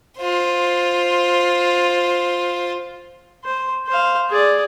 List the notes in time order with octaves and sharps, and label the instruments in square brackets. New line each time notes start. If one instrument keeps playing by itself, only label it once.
[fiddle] F4 C5
[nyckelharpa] C5
C5 F5
G#4 D5